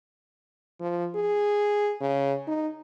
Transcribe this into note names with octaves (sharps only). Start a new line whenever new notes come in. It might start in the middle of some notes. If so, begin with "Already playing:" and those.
F3
G#4
C#3
D#4